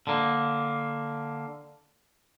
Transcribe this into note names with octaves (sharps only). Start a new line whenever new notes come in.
D3 A#3